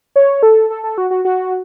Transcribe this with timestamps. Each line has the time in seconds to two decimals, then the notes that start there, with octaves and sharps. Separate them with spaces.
0.16 C#5
0.43 A4
0.70 A4
0.83 A4
0.98 F#4
1.11 F#4
1.25 F#4